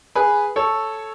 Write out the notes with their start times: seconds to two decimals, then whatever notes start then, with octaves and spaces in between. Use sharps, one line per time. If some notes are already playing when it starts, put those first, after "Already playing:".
0.15 G#4 B4
0.56 A4 C#5